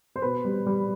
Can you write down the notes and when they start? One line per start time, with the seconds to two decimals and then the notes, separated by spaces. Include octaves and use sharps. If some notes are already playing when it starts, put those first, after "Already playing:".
0.16 C5
0.22 B2 B4
0.45 G3
0.66 G3